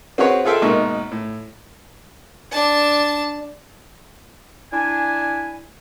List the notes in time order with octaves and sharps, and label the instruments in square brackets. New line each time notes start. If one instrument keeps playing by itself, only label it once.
[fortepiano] C4 F#4 G#4 B4 C#5
F4 G#4 A4 E5 F5 G5
G#1 B2 A#3 D#4 E5 C#6
A2
[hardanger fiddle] D4 A5
[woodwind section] D4 E4 G#5